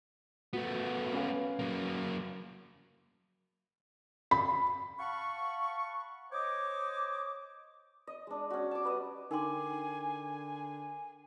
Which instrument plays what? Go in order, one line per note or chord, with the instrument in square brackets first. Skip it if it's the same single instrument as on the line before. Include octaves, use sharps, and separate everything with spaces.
[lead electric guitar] A3 B3 [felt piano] F#4
[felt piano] C#4 B4 F5
[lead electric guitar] F#3 A#3
[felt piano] B5
[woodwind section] F5 F#5 A5 B5 C#6
C5 C#5 D#5 D6
[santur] D#5
G#3 D4
C#4 F#4
A5 D6
G3 B4 D#5
[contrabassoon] D3 [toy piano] D#4 C6 [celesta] A#4 G5 D6 [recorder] G#5